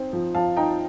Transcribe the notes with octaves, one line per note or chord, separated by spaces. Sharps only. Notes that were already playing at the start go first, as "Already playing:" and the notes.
Already playing: C4 D#4 C5
F3
F3 F5 A5
D#4 G5 A#5